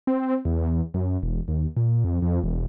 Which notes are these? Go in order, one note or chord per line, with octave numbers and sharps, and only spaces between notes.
C4
E2
F#2
E1
D#2
A#2
F2
F2
E1